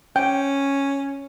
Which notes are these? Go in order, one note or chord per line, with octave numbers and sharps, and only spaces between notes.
C#4 G5